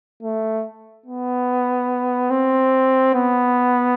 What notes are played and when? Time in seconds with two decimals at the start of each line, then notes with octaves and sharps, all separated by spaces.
0.22 A3
1.06 B3
2.30 C4
3.14 B3